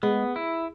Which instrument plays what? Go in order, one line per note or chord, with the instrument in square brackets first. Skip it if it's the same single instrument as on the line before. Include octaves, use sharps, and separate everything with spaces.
[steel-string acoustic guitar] G#3 [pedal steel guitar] B3
[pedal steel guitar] E4